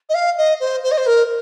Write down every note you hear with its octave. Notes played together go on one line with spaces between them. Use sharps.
D#5
F5
D#5
C5
C5
D#5
C5
A#4